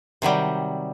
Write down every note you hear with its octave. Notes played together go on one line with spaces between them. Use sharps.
C3 D#3 F#3 G3